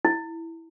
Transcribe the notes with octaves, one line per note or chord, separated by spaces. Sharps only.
E4